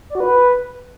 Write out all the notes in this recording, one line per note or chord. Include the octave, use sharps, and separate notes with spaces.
D5
F#4
B4